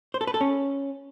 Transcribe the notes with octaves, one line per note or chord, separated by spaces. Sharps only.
C5
A4
B4
A4
C#4